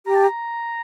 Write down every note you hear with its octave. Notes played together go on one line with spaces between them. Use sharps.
G4 A#5
A5
A#5